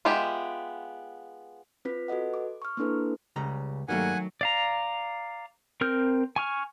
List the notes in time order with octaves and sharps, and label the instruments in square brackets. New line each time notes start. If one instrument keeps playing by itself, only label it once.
[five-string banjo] G#3 B3 F4 G4 E5
[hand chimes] C4 F4 B4 B6
F#4 A4 B4 D#5 F#5
D6
C#6 F6
A#3 C4 D4 E4 A4 B4
[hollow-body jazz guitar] C#2 C#3 G3 [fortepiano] A#5
[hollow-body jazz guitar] G2 G3 A#3 [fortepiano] D#3 A3 [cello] F#3 [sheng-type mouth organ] F#5 G#5
[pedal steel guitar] D5 F5 A#5
C4 A#4 F6 G6
G#5 C#6 F6